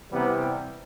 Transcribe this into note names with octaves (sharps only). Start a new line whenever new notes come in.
C3 E3 G3 B3